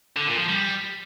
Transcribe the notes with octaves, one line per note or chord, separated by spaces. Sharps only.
D3
A#2
F3
G3